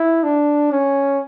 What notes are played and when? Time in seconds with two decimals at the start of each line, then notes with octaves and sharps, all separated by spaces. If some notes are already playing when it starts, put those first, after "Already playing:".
Already playing: E4
0.24 D4
0.72 C#4